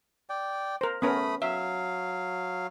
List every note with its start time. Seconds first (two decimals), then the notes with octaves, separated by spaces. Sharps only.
0.29 D5 G5
0.81 A#4 C5
1.02 A3 B3 C#4 A#4 B5 D#6
1.42 F#3 E5 F5